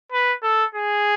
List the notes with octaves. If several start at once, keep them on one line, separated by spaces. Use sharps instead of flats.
B4
A4
G#4